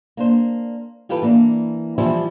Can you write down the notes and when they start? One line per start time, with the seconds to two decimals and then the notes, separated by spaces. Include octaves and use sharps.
0.17 A#3 D4 C5
1.09 E3 F4 G4 A4 B4
1.22 E3 A#3 D4
1.98 E3 F3 G3 E4 G4 C5